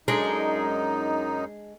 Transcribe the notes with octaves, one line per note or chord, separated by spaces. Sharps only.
F#2 G#3 D4 D#4